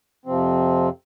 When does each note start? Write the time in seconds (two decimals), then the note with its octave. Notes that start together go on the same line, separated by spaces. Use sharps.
0.26 F2 C3 F3 C4